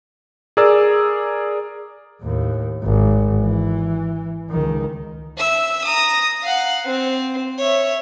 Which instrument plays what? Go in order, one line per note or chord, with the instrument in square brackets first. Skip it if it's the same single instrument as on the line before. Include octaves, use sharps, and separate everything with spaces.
[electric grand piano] G#4 A#4 D5 E6
[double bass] D#2 A2
G#1
E3
C#2 D#3
[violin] E5 E6
A#5 D#6
F5 F#5
C4
C#5 E5